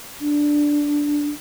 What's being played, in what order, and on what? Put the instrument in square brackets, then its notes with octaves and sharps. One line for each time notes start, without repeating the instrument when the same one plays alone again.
[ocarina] D4